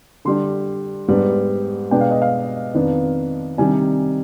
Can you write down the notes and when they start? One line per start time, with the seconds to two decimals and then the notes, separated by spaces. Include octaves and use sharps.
0.25 D3 G3 D4 C6
1.08 G#2 G3 B3 D4
1.91 B2 G#3 B3 D4 G5
2.01 F5
2.11 D#5
2.22 F5
2.74 F2 D#3 B3 D4
3.58 C3 D#3 G3 D4 G#5